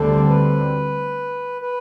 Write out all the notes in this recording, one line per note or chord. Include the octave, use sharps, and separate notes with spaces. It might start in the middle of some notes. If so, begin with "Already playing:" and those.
Already playing: D2 D3 G3 C4 A4
B4
B4